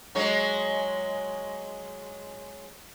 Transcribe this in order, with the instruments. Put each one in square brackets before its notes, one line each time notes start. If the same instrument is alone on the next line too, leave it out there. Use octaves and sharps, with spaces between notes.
[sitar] F#3 G#3 C#5